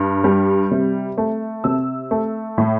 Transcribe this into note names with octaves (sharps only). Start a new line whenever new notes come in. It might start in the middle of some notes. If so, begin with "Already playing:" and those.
Already playing: G2
G3
C3
A3
C3 E6
A3
A2